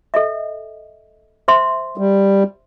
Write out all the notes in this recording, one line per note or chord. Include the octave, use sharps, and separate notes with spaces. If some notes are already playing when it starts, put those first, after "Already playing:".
A4 D#5 E5
C5 E5 C6
G3